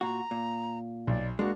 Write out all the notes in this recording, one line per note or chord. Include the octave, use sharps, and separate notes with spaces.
A#2 F#4 A#5
A#2
B1 D5
G#3 A#3 D4 F#4